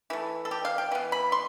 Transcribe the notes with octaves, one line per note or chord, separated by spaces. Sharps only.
E3 A3 E4
A4
G4
F5
G5
E3 B3
B5
C6